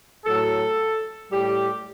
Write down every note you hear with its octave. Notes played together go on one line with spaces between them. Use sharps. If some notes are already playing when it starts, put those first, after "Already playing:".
A2 F#3 A4
A2 G3 G4